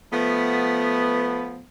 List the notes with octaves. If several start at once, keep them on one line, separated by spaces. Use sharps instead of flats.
F3 A3 B3